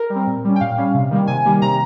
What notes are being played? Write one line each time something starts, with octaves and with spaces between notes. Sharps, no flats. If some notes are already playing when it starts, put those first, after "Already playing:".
Already playing: A#4
G3
C4
A#2
G3 C#4
G5
A#2 F5
G3 C#4
C3
D#3 G3 A#3
C3 G#5
D#3 G3 A#3
C3 A#5